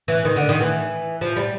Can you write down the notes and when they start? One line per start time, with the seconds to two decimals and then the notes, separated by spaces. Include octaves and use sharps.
0.08 E3
0.25 D#3
0.36 D3
0.49 D#3
0.61 E3
1.21 F3
1.36 G3